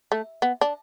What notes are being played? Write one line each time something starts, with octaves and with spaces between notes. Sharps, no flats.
A3
B3
D4